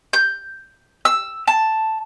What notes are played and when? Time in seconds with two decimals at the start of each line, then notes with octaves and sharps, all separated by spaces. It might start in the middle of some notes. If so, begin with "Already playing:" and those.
0.13 G6
1.05 E6
1.47 A5